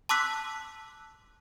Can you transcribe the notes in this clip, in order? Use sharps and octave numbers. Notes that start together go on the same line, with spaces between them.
A5 C6 D6 E6 F#6 B6